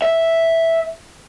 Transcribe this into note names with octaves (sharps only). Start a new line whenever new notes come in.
E5